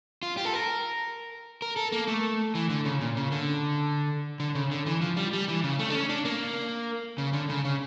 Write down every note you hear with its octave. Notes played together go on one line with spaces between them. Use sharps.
F4
G4
A4
A#4
A#4
A4
A#3
A3
E3
D3
C#3
A#2
C#3
D3
D3
C#3
D3
E3
F3
G3
G3
E3
C#3
A3
D4
C#4
D4
A#3
C#3
D3
C#3
C#3